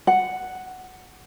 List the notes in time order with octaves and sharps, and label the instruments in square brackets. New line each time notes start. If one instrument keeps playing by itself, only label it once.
[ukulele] F#5